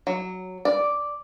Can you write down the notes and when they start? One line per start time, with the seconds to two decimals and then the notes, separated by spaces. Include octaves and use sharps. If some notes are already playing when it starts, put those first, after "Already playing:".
0.07 F#3
0.65 D5